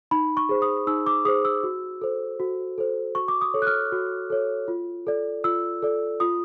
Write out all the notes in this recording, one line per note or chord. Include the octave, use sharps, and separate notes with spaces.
D#4 B5
C#6
G#4 C5
D#6
D#4 E6
D6
G#4 C5 D#6
E6
F#4
A4 C5
F#4
A4 C5
F#4 C#6
D6
D#6
A4 C#5
F#6
F6
F#4
A4 C#5
F4
A4 D5
F4 E6
A4 D5
F4 D#6